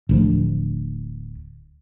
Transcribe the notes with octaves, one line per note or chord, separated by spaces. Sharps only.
D1 D2 F3